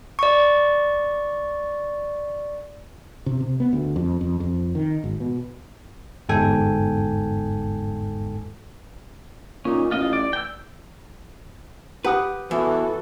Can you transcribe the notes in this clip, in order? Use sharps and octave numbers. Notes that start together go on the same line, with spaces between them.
D5 C#6
C3
C3
B3
D2
F2
F2
F2
D#3
G#1
B2
G1 E2 G#2 A4 G5 G#5
A#2 C#4 D#4
A1 F4 D#5
D5
G5 E6
G4 B4 F#5 D#6
E2 E3 F#4 A4